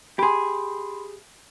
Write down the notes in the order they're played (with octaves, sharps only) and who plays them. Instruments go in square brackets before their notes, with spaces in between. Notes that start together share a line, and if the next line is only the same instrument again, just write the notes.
[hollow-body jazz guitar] G4 G#4 [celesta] B5 C6